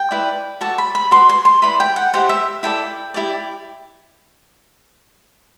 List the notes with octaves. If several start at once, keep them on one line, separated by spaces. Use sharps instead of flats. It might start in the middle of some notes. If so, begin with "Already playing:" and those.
Already playing: G5
E4 B4 D5
F#4 A4 D5 A5
B5
B5
F#4 B4 D5 C6
C6
C6
E4 G4 B4 D5 B5
G5
F#5
E4 G4 C5 F#5
E5
E4 A4 D5 G5
E4 G4 D5